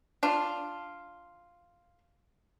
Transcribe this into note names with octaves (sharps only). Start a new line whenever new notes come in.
D4 F4